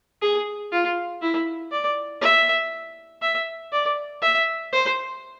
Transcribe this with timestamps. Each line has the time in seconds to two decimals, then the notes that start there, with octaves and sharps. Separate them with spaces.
0.22 G#4
0.72 F4
1.21 E4
1.72 D5
2.21 E5
3.22 E5
3.72 D5
4.22 E5
4.72 C5